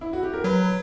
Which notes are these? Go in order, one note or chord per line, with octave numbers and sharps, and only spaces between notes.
E4
F#4
G4
A#4
F#3 B4